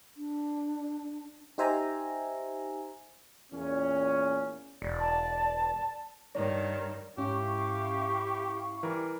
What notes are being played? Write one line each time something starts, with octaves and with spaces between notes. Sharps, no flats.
D4
D#4 G4 C5 E5 G#5 A#5
E2 A#2 C#4
E1 D5
A5
G2 D#3 C#5 D5
G#2 C#4 E4 G4 F5 C#6
E3 G3 A#4